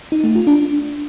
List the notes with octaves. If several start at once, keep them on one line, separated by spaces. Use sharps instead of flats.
D#4
A3
F4
D4